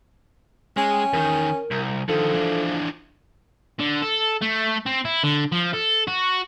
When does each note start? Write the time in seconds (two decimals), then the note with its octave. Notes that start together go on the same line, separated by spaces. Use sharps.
0.77 G#3 C#4
0.92 G5
1.13 E2 D#3 A#4
1.71 C2
2.09 D3 D#3 F3 A4
2.34 E3 D4
3.80 D3
4.02 A4
4.41 A3
4.86 C4
5.05 E4
5.24 D3
5.52 F3
5.74 A4
6.08 F#4